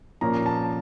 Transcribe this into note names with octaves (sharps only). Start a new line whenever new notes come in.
A#2 F3 A#3 C#4 A#5
A5